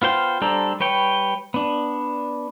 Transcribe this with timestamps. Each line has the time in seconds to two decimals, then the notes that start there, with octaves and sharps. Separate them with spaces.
0.02 B3 F4 C5 G5
0.41 G3 D4 A4 C5 A#5
0.80 G3 B4 C#5 G5
1.54 B3 D4